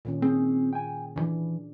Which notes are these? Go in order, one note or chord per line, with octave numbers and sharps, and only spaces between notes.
A#2 D#3 C#4
C4 G#4 C5
G5 G#5
D2 E3 D4